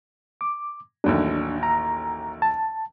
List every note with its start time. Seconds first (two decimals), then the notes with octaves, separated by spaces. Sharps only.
0.41 D6
1.04 A1 D#2 F#3 D4
1.63 A#5
2.42 A5